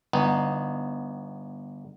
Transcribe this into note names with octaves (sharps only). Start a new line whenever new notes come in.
G1 B3 D#4